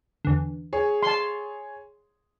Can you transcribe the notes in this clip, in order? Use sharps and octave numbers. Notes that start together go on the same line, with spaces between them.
E2 D3
G#4 C#5
A5 C6